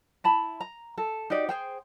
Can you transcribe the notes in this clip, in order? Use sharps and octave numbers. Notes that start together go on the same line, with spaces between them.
E4 A5 B5
A#5
A4
D#4 F#4 G4 D5
G#4 C5 G5